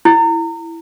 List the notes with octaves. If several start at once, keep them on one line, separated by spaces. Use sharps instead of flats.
E4